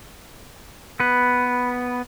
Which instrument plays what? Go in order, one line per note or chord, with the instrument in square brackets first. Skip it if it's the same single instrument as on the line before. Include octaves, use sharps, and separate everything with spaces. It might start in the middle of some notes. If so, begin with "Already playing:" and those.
[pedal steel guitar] B3 B4